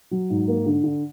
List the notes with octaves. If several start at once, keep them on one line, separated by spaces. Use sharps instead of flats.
F#3
G#2
A#3
D3
D3